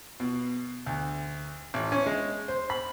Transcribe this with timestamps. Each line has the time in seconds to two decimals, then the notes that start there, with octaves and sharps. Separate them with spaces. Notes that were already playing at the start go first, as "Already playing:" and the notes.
0.20 B2
0.86 D2
1.74 A1
1.92 C#4
2.06 G#3
2.48 C5
2.70 B5